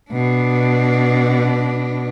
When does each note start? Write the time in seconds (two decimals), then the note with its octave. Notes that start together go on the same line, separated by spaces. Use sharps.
0.11 B2 D4